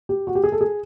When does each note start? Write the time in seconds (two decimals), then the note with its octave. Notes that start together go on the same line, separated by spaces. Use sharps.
0.09 G4
0.27 F#4
0.35 G4
0.44 G#4
0.52 A4
0.61 G#4